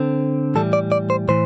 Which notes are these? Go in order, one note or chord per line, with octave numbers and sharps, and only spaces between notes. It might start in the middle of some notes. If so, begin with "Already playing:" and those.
Already playing: D3 C4
A2 E3 G3 A4
D5
D5
C5
A2 E3 C5